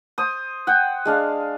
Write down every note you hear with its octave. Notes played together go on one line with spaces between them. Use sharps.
C5 D#6
F#5 G5
G#3 D4 F5